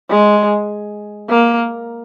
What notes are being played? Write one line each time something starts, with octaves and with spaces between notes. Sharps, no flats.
G#3
A#3